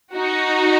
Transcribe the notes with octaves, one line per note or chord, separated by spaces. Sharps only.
D#4 F#4